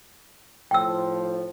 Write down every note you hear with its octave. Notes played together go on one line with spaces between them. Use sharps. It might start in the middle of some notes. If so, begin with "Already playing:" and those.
A2 F3 G5 E6